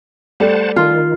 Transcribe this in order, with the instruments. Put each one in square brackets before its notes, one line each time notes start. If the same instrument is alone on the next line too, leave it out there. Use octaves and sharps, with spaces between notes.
[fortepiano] G3 A3 [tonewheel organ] C5 F#5 A5
[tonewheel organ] D#3 [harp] F4